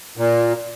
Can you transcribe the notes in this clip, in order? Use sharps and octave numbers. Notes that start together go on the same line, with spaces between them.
A#2